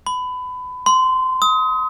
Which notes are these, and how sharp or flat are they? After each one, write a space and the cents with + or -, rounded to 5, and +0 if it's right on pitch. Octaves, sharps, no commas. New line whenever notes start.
B5 +25
C6 -25
D#6 +30